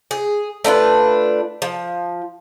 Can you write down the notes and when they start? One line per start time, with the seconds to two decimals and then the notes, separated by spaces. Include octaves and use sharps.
0.11 G#4
0.64 A3 D4 F4 B4
1.62 F3